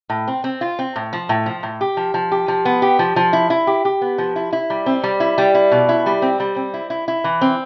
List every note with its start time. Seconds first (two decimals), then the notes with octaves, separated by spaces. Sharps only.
0.10 A2
0.27 C4
0.44 C4
0.61 F4
0.79 C4
0.96 A2
1.13 F3
1.29 A2
1.46 F3
1.63 A2
1.81 G4
1.97 F3
2.14 F3
2.32 G4
2.48 F3
2.65 B3
2.82 G4
2.99 F3
3.16 F3
3.33 E4
3.50 E4
3.67 G4
3.85 G4
4.01 B3
4.18 F3
4.36 E4
4.53 E4
4.70 G3
4.86 C4
5.03 G3
5.20 E4
5.38 G3
5.54 E4
5.72 B2
5.89 E4
6.06 G3
6.22 C4
6.40 G3
6.56 C4
6.74 E4
6.90 E4
7.08 E4
7.24 E3
7.41 C4